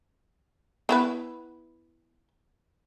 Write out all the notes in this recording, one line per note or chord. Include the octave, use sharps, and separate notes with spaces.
B3 E4 B4